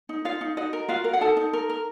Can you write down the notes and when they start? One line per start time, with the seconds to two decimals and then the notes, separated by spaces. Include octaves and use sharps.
0.09 D#4
0.25 D#4 F4 F5
0.41 D#4
0.57 D#4 F#4 D#5
0.73 A#4
0.89 F4 F#4 F5
1.04 A#4
1.13 F#5
1.21 D#4 A4 A5
1.37 D#4
1.53 A#4
1.69 A#4